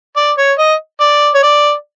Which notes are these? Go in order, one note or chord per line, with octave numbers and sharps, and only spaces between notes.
D5
C#5
D#5
D5
C#5
D5